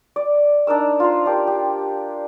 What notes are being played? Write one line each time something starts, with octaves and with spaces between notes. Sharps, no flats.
D5
D4 D#4 A#4 E6
F4 C5 A#5 C6
D4 G4 A#4
G4